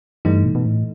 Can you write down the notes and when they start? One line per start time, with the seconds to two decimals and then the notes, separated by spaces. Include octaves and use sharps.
0.25 G2 E3 A3 D#4
0.45 B2
0.55 B2
0.66 A2